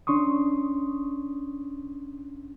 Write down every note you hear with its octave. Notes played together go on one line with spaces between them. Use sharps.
C#4 D4 C6 C#6 D#6